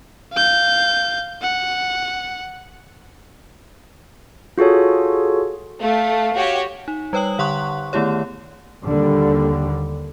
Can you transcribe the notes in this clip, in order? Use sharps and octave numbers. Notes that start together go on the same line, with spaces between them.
F5 G6
F#5
F4 F#4 G#4 A4 C#5
A3 F5
F#4 G4 C#5
D#4
G3 B4 C#5 G5 D#6 F#7
D3 F#5 C6 C#6 F#6
D#3 A3 B3 E4 G4 C#5
D#2 D3 G3